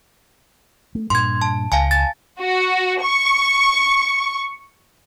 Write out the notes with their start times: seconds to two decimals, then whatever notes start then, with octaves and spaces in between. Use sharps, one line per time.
0.95 A3
1.10 G2 A#2 C6 G#6
1.42 A5
1.72 C#2 F5 G#5 A5
1.91 A6
2.41 F#4
3.04 C#6